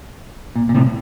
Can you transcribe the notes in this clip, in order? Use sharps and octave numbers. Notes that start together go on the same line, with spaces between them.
A#2
A#2
A2 C3